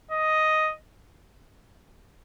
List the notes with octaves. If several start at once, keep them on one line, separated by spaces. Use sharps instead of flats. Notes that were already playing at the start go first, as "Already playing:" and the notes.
D#5